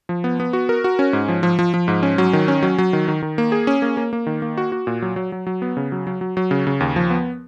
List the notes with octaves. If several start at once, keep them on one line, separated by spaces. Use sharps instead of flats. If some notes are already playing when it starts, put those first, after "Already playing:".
F3
B3
B3
F#4
A#4
F#4
C#4
G#2
F3
F3
F3
F3
G#2
C#4
F#3
D#3
C#4
F#3
F#3
D#3
D#3
D#3
A#3
G#4
C#4
A#3
A#3
A#3
D#3
A#3
F#4
F#4
A#2
F#3
F#3
F#3
F#3
B3
C#3
F#3
F#3
F#3
F#3
C#3
C#3
D#2
F3
B3